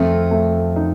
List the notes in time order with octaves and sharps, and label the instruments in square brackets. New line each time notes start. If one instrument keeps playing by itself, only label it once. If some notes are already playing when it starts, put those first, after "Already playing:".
Already playing: [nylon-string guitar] F2 [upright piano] A3
[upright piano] A3
D#4